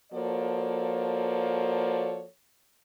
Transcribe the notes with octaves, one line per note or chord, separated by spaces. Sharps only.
F3 A#3 F#4 A4 C#5 D5